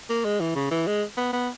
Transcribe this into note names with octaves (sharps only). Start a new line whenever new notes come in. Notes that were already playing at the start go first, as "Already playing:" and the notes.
A#3
G#3
E3
C#3
E3
G#3
B3
B3